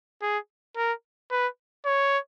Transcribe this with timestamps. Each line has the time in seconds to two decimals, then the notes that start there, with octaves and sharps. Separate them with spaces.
0.22 G#4
0.76 A#4
1.31 B4
1.86 C#5